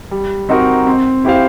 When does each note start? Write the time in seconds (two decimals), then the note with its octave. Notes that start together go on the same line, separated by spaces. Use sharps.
0.11 G3
0.49 C4 D#4 F#4 A#4
0.87 C4
1.25 E4 G4 C5 F5